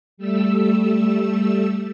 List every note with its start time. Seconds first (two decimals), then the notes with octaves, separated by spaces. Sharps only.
0.17 G3 A3 E6